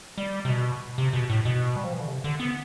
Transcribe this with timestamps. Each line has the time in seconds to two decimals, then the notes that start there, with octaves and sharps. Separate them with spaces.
0.18 G3
0.45 C3
0.49 B2
0.98 C3
1.13 B2
1.30 A2
1.45 B2
1.76 G3
1.84 F3
1.92 E3
2.00 D3
2.08 C3
2.24 D3
2.40 B3